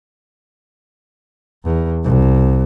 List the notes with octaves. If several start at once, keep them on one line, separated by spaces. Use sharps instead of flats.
E2
C2